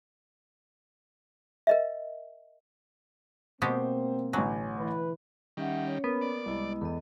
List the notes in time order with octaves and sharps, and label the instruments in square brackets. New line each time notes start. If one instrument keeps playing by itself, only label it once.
[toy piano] A#4 D#5 E5
[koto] B2 G#3 G4 [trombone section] A#3 C4 [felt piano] C5
[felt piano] A1 G#5 [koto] D3 F#3
[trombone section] E3 B4
[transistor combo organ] D#3 G3 [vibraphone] C#4 E5 F#5
[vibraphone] C#4 C#5
[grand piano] A#3 [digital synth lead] B3
[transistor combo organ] D5
[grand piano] C2 [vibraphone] G#3 E4 D#5
[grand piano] E2 [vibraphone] A4 D#5